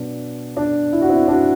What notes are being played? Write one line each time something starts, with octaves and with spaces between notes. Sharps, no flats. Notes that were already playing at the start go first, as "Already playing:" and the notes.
Already playing: B2 F#3 D4
D4
E4
F#4
C4 E4
D4 F#4